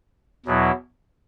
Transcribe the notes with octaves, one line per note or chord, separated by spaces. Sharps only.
E2 B2 F#3 B3 E4